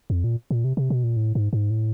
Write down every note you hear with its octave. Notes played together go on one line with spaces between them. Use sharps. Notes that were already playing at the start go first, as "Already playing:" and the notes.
F2
A#2
A#2
C3
C3
B2
A#2
A2
G#2
G#2
A2